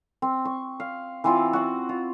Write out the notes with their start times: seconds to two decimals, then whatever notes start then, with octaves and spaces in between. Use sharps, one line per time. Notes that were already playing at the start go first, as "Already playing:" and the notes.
0.22 C4
0.45 C#6
0.80 F5
1.24 E3 C4 F4 D6
1.53 F#4 F#5
1.89 F4